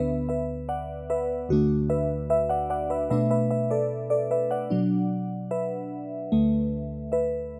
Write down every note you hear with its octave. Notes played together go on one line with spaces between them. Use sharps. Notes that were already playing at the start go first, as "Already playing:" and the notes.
Already playing: D2 D3 B3 B4 E5
B4 E5
D5 F#5
B4 E5
D2 D3 A3 D4 F#4
B4 E5
B4 E5
D5 F#5
D5 F#5
B4 E5
B2 A3 D4 B4 E5
B4 E5
B4 E5
A4 D5
A4 D5
B4 E5
D5 F#5
B2 F#3 D4
B4 E5
D2 D3 A3
B4 E5